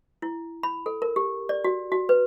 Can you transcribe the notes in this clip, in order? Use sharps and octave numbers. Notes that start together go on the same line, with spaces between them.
E4
B5
A4
A#4
G4
D5
F#4
F#4
B4